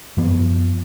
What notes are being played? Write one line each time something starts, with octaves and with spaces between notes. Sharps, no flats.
F#2 F3 B3